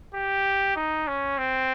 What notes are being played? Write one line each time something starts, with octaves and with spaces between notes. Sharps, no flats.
G4
D#4
C#4
C4